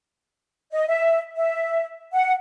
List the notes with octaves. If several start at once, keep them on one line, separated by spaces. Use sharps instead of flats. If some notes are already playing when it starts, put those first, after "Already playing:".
D#5
E5
E5
F#5